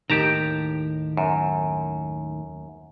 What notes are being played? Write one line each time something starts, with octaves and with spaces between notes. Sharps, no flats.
D#2 A2 D#3 G4 A5 A#5
F#2